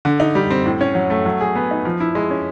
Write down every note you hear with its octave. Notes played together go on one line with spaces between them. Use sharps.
D3
D#4
G3
C4
A2
C#4
F#3
A3
F#3
G#4
B3
D#4
F3
E4
G#3
C#4